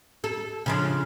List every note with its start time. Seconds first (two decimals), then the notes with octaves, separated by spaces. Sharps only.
0.24 A4
0.66 C#3 F3 D4